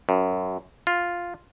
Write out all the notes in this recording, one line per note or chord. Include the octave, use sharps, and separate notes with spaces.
F#2
F4